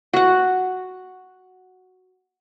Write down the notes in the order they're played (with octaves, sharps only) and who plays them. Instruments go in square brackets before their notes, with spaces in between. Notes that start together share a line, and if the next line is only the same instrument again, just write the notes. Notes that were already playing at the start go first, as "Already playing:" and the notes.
[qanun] F#4 F#5